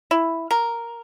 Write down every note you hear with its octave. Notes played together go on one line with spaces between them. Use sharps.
E4
A#4